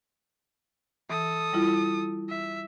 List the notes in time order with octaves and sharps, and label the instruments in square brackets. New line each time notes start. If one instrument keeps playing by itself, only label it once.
[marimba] E3 [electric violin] A4 D#6
[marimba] G3 E4 F4
[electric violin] E5